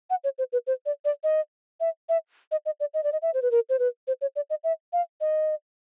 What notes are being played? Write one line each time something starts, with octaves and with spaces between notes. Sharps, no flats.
F#5
C#5
C5
B4
C5
D5
D5
D#5
E5
E5
D#5
D#5
D5
D#5
D5
D#5
E5
C5
B4
A#4
C5
B4
C5
C#5
D5
D#5
E5
F5
D#5